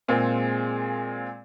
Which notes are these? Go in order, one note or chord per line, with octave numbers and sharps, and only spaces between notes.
A#2 G#3 C4 F4 G#4